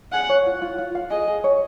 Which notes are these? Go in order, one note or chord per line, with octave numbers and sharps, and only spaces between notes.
G#4 F#5
C#5
F4
F4
F4
F5
G#4 D#5
G#4
C#5